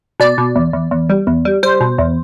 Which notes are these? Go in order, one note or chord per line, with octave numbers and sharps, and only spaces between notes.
B2 D5
B2
E2
E2
E2
G3
E2
G3
G3 C5
B2
E2